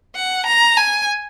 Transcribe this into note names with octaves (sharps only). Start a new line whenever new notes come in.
F#5
A#5
G#5